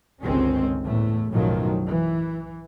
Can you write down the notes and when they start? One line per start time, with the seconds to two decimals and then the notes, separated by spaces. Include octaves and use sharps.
0.22 G1 C#2 D#3 G#3 C4 C#4
0.84 E2 A2 A3
1.32 B1 F#2 A2 D#3 F3 F#3
1.85 E3